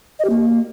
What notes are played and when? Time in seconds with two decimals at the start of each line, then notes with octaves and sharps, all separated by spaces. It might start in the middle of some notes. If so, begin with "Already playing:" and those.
0.19 D#5
0.25 G4
0.30 A#3